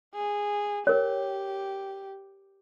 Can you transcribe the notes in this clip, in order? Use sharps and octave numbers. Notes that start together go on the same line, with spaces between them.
G#4
G4 A#4 C#5